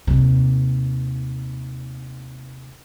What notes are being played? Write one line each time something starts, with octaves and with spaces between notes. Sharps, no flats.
D#2 C3